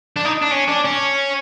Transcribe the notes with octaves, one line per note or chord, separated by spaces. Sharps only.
D4
D#4
D4
C#4
D4
C#4